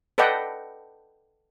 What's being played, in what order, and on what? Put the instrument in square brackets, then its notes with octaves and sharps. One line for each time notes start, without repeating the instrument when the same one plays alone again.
[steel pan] A4 B4 D5 D#5 F#5 G5